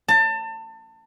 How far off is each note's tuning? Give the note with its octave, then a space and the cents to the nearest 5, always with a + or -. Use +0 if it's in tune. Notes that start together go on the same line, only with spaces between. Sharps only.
A5 +30